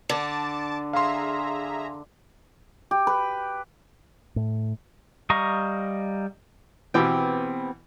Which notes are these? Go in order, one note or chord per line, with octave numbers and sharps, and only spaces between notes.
D3 A5 D6 A6
G#4 E5 F5 A#5 C6
G4
B4
A2
G3 D#5 F5 A#5 C#6
B2 E3 B3 C4 G4 G5